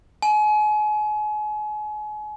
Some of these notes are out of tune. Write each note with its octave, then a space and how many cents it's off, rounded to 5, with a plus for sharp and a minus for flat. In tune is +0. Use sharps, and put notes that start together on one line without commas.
G#5 +35